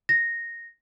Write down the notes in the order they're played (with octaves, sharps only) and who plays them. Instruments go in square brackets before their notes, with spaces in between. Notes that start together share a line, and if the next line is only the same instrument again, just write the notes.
[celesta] A#6